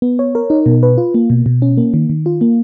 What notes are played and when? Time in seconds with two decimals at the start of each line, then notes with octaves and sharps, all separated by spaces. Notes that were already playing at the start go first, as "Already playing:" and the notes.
0.02 B3
0.19 C#5
0.35 A#4
0.50 D#4
0.66 B2
0.83 B4
0.98 F4
1.14 A#3
1.30 B2
1.46 B2
1.62 C#4
1.77 A#3
1.94 D#3
2.09 D#3
2.26 F4
2.41 A#3